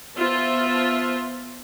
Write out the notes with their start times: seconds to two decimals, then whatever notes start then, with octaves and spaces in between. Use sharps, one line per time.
0.17 B3 F4 C5 E5 A5